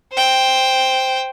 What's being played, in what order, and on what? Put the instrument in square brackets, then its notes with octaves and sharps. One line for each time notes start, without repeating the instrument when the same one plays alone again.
[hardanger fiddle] C5 G5